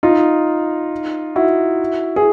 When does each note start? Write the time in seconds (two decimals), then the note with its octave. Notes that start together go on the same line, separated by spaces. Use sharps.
0.03 D#4 F4
1.36 E4 F#4
2.16 G#4